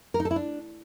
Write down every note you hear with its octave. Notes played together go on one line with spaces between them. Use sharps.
A#4
D#4
A4
E4
D4